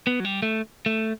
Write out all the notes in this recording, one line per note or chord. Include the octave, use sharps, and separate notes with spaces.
B3
F#3
G3
A3
A3